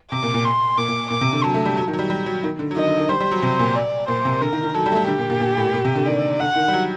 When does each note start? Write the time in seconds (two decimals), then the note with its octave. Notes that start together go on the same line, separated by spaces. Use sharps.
0.12 C3 D6
0.23 A#2
0.34 A#2
0.45 C6
0.78 A#2 D6
0.88 A#2
1.10 A#2 D6
1.21 C3
1.33 D3
1.44 F#3 A5
1.54 A3
1.66 G3
1.77 F#3
1.88 D#3
1.93 F#3
1.99 G3
2.10 G3
2.26 F#3
2.43 D#3
2.59 D3
2.71 F#3
2.76 D#3 D#5
2.87 D3
2.98 D#3
3.09 G3 C5
3.20 G3
3.31 F#3
3.42 C3 C5
3.59 A#2
3.75 D5
4.08 A#2 C5
4.25 C3
4.41 D3 A#4
4.53 D#3
4.63 D#3
4.74 F#3 A4
4.86 G3
4.92 A3
4.96 G3
5.08 D3 G4
5.18 A#2
5.30 A#2
5.40 A#2
5.57 A2
5.73 A#2
5.85 C3
5.96 D3
6.06 D#3 D5
6.40 D3 F#5
6.56 D#3
6.68 G3
6.73 F#3